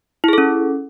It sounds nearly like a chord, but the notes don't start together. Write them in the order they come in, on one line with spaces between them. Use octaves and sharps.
E4 G#4 A4 C#4